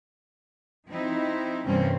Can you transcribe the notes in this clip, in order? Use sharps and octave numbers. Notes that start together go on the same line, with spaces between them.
F3 C4 D#4 E4
E2 G2 C3 A#3 C4 C#4